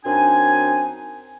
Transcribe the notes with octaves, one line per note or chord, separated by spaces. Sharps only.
F#2 C4 D4 D#4 G#5